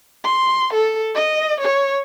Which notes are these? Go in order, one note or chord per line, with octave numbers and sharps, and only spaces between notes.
C6
A4
D#5
C#5